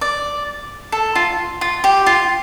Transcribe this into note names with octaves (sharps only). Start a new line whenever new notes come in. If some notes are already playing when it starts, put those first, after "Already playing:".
D5
A4
F4
F4
G4
F4